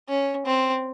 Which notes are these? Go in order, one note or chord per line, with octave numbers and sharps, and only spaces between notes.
C#4
C4